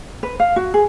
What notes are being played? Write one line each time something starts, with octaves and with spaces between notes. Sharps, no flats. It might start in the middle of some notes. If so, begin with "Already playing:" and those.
B4
F5
F#4
G#4